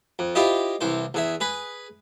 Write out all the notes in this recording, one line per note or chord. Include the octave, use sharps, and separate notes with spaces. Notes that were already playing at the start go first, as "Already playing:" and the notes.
F2
E4 F4 G4 C5 D#5
C2 E3 C5
E2 G#4 E5
G#4 B4 B5